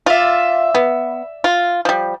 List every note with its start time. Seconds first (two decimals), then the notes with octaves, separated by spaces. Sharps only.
0.06 F4 D5 E5
0.75 B3
1.44 F4
1.85 F3 G3